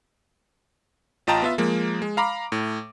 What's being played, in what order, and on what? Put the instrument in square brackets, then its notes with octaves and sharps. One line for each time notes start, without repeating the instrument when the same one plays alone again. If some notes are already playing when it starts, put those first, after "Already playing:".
[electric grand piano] A1 F4 D#5 G5 A5 A#5
B3 F4 E5
F3 G#3 A#3
G#3
F5 A#5 B5 D6
A2